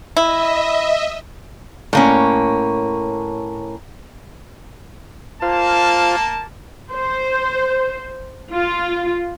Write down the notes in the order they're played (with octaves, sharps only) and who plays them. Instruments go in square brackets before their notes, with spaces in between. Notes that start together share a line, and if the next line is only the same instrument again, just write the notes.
[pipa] E4 [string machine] D#5 E5
[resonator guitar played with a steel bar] A2 A#3 C#4
[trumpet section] A#3 A5 [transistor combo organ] F4 C5 F5
[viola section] C5
F4